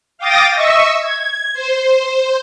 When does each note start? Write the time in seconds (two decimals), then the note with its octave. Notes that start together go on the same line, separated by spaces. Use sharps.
0.18 F5 G5 D6 D#6 A6 A#6
0.54 D#5 E5 C#6 E6
1.01 G#6
1.53 C5